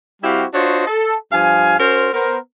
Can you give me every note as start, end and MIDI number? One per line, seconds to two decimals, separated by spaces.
0.23 0.44 55
0.23 0.44 60
0.23 0.44 64
0.23 0.44 66
0.23 0.44 67
0.23 0.44 77
0.53 0.85 62
0.53 0.85 65
0.53 0.85 66
0.53 0.85 72
0.53 0.85 73
0.53 0.85 75
0.87 1.15 69
1.32 1.77 43
1.32 1.77 53
1.32 1.77 77
1.32 1.77 80
1.79 2.09 61
1.79 2.09 66
1.79 2.09 70
1.79 2.09 72
2.13 2.37 59
2.13 2.37 70
2.13 2.37 72